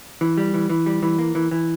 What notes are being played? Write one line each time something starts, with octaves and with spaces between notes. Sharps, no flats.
E3
G3
E3
E3
G3
E3
A#3
E3
E3